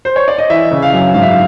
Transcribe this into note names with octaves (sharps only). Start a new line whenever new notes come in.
C5
C#5
D5
D#5
E3 E5
C#3
F5
F#2
G#2 F5
E5
F5